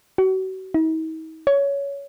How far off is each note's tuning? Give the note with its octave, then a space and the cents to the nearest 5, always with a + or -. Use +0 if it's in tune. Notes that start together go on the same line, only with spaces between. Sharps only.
F#4 +35
D#4 +45
C#5 +15